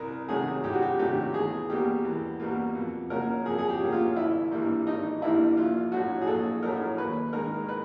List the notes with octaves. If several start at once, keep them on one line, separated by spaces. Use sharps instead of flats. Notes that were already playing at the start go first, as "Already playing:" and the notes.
Already playing: C2 A#4
C3 D#3 F#3 A3 G#4
C2 G4
F#4
G4
C3 D#3 F#3 A3 G4
E2 G#4
B2 G3 A#3 G4
E2
B2 G3 A#3
F2
C#3 F#3 A#3 A#4
F2 G#4
G#4
G4
C#3 F#3 A#3
F4
G#1 E4
G2 E3 G3 A#3
G#1 D#4
G2 E3 G3 A#3 E4
A#1 F4
A2 F#3 A3 F#4
G#4
A#1 A4
A2 F#3 A3 A#4
D#2 B4
D#3 G#3 A#4
B4